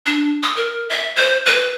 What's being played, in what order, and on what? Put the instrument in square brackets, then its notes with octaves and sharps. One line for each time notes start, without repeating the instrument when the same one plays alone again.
[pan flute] D4
D#6
A#4
E5
C5
B4